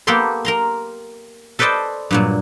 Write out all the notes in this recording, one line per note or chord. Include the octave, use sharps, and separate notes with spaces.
A#3 B3 G4 A4 F#5 C6
A#4 A#5 C6
A4 B4 C5 D5 D#5 A5
G2 A#2 F#3